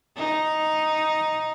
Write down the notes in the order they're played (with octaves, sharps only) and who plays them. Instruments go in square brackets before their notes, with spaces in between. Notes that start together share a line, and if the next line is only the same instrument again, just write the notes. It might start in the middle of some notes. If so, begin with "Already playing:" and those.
[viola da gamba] D#4